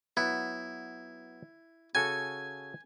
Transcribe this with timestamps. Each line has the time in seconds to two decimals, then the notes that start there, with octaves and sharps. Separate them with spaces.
0.17 F#3 B3 E4
1.95 C#3 F#4 A4 G#5